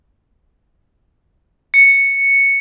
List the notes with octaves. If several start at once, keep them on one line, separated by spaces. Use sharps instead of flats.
C#7